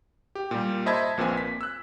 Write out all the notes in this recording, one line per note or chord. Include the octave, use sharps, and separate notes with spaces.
G4
A#2 G3
C5 D#5 E5 A5 B5 G#6
A#1 A#2 C4 B4 G#5
B6
E6 F#6